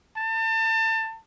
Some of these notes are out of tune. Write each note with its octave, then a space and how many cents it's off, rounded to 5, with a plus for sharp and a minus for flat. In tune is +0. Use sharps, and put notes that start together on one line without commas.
A5 +30